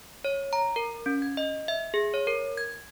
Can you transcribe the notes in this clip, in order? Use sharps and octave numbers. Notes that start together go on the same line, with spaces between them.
C#5
A#5
A#4
C#4
G#6
D#5
E5
G#4
C#5
A#4
G#6